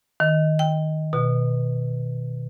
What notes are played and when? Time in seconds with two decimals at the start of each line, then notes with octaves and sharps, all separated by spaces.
0.20 D#3
0.59 G5
1.13 B2